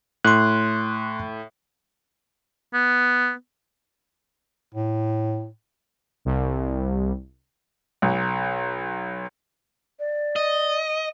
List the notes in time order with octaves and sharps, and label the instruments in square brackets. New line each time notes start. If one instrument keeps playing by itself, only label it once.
[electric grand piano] A2 [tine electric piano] C6 F#6
[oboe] B3
[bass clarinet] A2
[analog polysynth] C2
[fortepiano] B1
[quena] D5
[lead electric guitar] D#5